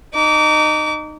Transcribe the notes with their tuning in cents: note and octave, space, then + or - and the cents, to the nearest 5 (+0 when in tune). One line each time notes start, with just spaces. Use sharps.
D#4 -20 D6 -30